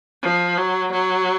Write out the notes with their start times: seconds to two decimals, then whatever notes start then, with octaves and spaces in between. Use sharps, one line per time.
0.23 F3
0.57 F#3
0.92 F#3